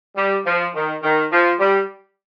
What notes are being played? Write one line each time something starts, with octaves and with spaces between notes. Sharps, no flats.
G3
F3
D#3
D#3
F3
G3